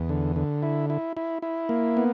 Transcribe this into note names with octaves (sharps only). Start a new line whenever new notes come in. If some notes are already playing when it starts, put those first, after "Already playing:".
Already playing: E2
D3
D3
E4
E4
E4
E4
A#3
B3